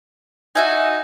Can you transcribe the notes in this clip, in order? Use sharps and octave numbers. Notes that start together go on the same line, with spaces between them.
D#4 F#4 E5 G#5